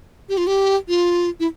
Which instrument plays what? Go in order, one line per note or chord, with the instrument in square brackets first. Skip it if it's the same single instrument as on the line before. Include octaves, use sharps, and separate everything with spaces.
[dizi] G4
F4
G4
F4
E4